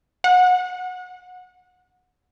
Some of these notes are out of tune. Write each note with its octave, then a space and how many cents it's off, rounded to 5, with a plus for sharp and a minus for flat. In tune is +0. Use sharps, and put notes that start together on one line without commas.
F#5 -20